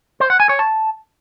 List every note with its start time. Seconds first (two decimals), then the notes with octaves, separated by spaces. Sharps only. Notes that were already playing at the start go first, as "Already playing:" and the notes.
0.20 C5
0.30 F#5
0.40 G#5
0.49 C#5
0.59 A5